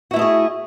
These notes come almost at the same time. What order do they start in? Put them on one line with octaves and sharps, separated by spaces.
F#4 E4 A3 D#5 G#4